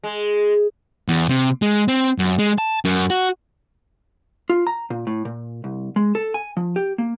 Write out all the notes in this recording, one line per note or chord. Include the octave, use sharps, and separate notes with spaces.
G#3
E2
C3
G#3
C4
F#2
G#3
A5
F#2
F#4
F4
A#5
A#2
A2
A#2
C2
G#3
A4
G#5
F3
G4
A#3